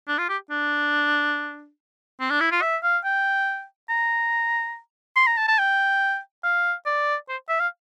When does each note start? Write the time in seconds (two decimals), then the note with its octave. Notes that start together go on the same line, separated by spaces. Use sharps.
0.08 D4
0.19 F4
0.29 G4
0.51 D4
2.20 C4
2.31 D4
2.41 E4
2.51 F4
2.62 E5
2.83 F5
3.05 G5
3.90 A#5
5.16 C6
5.27 A#5
5.37 A5
5.48 A5
5.59 G5
6.44 F5
6.86 D5
7.29 C5
7.49 E5
7.60 F5